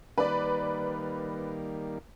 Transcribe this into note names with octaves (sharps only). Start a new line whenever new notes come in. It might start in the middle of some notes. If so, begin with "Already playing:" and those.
D#3 G3 A#3 B4 D5